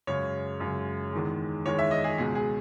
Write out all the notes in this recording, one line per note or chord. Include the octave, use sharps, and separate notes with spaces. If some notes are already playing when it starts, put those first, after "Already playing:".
F#2 C#3 G#3 C#5
F#2 C#3 G#3
E2 D#3 G#3
E2 D#3 G#3 C#5
E5
D#5
G#4
C#2 B2 G#3 G#4
G#4